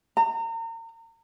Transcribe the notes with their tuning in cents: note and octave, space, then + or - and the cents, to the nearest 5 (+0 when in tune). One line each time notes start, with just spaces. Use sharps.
A#5 -35